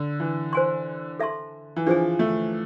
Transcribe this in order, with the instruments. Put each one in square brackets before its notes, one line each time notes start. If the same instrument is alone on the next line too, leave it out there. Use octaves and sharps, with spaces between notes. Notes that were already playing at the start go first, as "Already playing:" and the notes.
Already playing: [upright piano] D3
E3
[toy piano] C5 G#5 C6
A4 E5 A5 C6
[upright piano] E3
[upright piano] F3 [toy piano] D4 G#4 C5 G#5
[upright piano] A3